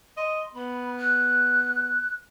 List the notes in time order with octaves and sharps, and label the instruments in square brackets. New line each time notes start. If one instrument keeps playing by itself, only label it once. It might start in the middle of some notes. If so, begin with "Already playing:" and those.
[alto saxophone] D#5 [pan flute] C6
[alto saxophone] B3 [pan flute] B5
[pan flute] F#6